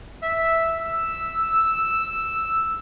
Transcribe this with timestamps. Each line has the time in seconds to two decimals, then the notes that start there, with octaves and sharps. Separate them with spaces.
0.23 E5
0.80 E6